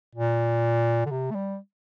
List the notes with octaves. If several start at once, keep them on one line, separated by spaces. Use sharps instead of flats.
A#2
D3
C3
A3
G3